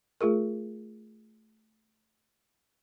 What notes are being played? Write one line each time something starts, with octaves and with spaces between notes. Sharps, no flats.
A3 F4 G#4 A#4